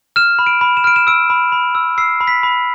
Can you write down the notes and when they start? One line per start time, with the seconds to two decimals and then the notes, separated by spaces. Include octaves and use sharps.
0.16 F6 E7
0.39 B5
0.47 D7
0.61 B5
0.77 E7
0.84 F6 D7
0.96 E7
1.07 E6 D7
1.30 B5
1.52 B5
1.75 E6
1.98 E6 C7
2.20 B5
2.28 B6
2.43 B5